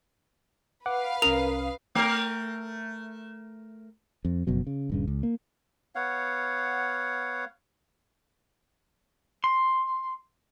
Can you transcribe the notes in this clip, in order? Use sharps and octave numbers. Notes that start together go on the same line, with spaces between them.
B4 F5 F#5 D6
C2 C#4 A#4 D#6 F7
A3 A#4
F2
F#1 F2 B2 F#3
C#3
D#1 G2 C#3
C#2
A#3
B3 C#5 F5 F#5
C6